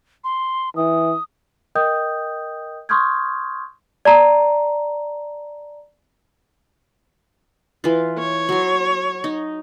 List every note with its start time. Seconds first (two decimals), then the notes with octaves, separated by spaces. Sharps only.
0.24 C6
0.76 E3 D#6
1.75 A#4 D#5 G5 D#6 G6
2.89 C6 C#6 D#6 F6 G6 G#6
4.05 D5 A5 A#5
7.84 E3 F4
8.18 C#5
8.49 F#3 C6
9.24 D#4